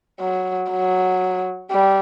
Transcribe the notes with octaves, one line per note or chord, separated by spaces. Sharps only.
F#3
F#3
G3